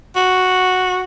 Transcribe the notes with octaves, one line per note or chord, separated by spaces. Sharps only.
F#4